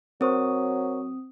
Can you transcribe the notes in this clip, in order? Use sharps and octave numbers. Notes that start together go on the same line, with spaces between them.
F#3 C4 A#4 C5 C#6 D#6